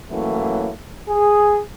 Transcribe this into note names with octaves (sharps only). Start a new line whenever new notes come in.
E3 F#3 A3 A#3 C#4 E4
G#4